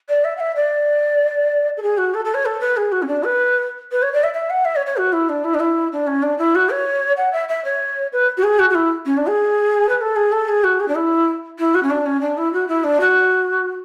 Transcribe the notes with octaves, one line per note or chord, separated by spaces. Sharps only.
D5
E5
F#5
E5
D5
A4
G#4
F#4
A4
A4
C#5
A4
B4
G#4
F#4
C#4
D4
B4
B4
C#5
D5
E5
E5
F#5
E5
C#5
C#5
F#4
E4
D4
E4
D4
E4
D4
C#4
D4
E4
F#4
C#5
F#5
E5
E5
C#5
B4
F#4
G#4
F#4
F#4
E4
C#4
D4
G#4
B4
A4
G#4
A4
G#4
F#4
G#4
D4
E4
E4
F#4
C#4
D4
C#4
D4
E4
F#4
E4
D4
F#4